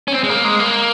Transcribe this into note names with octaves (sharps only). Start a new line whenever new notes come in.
C#4
C4
G#3
A#3
G#3
A#3